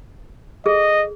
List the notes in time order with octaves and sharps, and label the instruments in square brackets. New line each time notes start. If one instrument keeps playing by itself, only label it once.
[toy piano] G#4 A4 [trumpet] D#5